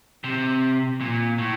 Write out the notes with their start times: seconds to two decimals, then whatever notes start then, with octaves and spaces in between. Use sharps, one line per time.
0.24 C3
1.01 A#2
1.38 A2